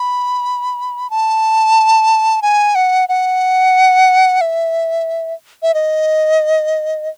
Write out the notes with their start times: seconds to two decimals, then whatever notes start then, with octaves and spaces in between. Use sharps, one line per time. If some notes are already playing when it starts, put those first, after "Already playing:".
Already playing: B5
1.10 A5
2.42 G#5
2.75 F#5
3.09 F#5
4.41 E5
5.62 E5
5.74 D#5